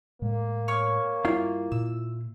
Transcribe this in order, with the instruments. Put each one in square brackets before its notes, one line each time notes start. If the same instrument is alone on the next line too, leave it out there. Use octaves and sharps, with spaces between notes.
[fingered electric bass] A2 G#3 [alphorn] A#3
[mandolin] C#5 C#6 F6
[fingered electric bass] G2 [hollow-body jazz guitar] E4 F4 F5
[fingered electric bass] A#2 [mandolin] E6